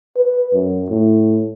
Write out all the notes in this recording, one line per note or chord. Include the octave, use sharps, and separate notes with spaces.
B4
F#2
A2